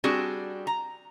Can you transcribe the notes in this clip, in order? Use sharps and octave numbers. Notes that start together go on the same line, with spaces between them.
G3 C4 D4 F#4 G#4
A#5